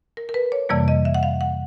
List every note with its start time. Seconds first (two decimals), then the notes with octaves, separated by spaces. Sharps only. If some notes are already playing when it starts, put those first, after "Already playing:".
0.17 A#4
0.29 A#4
0.34 B4
0.52 C#5
0.69 F2 C3 E3 G3 A#3 D5
0.88 D#5
1.05 E5
1.14 F#5
1.23 F5
1.41 F#5